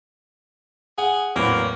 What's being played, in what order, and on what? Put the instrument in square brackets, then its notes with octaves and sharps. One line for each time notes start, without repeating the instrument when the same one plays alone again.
[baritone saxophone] G#4 [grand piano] F#5
[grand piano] E2 A2 [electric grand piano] E3 F#3 C4 [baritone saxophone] A#3